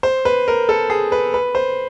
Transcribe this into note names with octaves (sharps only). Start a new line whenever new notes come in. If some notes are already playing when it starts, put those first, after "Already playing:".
C5
B4
A#4
A4
G#4
B4
B4
C5